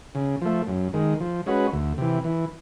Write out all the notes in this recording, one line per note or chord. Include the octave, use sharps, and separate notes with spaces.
C#3
F3 A3
F#2
D#3 G#3
F3
G#3 C#4 F#4 B4
D2
C3 E3
E3